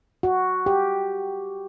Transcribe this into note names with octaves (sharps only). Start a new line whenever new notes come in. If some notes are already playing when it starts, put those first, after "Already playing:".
F#4
G4